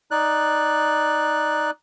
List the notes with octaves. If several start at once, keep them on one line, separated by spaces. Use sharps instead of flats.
D#4 D5 F#6